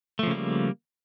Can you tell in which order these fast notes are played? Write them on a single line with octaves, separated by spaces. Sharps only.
A3 F3 C#3 A#3 G3